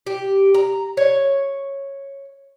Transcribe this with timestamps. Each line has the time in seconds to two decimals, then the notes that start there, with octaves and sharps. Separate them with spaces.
0.07 G4
0.54 A#5
0.97 C#5